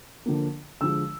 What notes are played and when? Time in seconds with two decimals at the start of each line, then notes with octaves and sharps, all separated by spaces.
0.26 D3 F3 A#3
0.81 D3 F3 G#3 E6